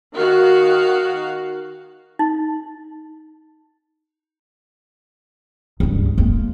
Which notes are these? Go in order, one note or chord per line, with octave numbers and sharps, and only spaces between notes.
D#3 F#4 F5
D#4
C#2 G2
G#3 A#3